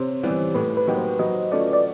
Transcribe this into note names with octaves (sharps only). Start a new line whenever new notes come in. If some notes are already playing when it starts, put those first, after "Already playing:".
Already playing: C3 C5 C#5
E3 G3 B3
A2 B4
B4
F#3 A#3 D#4 G4
C5
F#3 D#5
A3 C#4 F4 D5
D5